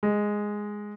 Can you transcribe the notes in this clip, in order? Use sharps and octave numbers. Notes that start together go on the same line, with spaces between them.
G#3